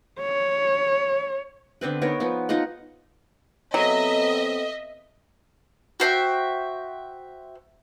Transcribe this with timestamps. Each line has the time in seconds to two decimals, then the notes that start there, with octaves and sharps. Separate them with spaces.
0.20 C#5
1.81 D3 B3 C4 B4
2.02 B3 D#4 A#4 C#5
2.20 F3 B3
2.49 D#4 F4 D#5 F#5
3.74 F#3 B3 C4 A4 D#5 E5
6.00 F#4 C5 E5 G5